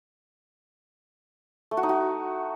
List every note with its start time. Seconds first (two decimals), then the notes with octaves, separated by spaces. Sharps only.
1.71 A3
1.77 F#4
1.83 D#4
1.89 F#4